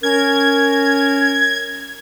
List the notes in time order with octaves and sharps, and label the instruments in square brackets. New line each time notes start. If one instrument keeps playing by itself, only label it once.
[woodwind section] C#4 A#4 [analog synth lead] G#6